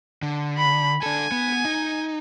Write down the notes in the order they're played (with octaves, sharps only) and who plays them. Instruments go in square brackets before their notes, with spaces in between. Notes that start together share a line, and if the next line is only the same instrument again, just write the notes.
[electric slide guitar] D3
[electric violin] B5
[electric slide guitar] D4 A4 [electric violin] G#5
[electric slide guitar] B3
D#4